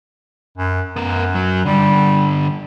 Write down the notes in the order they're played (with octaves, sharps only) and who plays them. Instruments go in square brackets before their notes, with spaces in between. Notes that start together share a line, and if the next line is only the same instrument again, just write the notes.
[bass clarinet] F#2
[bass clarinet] F#2 [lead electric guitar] B3 A#4
[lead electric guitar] F#3
[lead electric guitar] G2 D3 [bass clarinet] G3